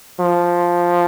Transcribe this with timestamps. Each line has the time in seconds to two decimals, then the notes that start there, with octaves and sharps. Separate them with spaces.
0.20 F3